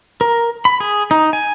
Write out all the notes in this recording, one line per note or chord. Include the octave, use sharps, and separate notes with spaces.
A#4
B5
G#4
D#4
G#5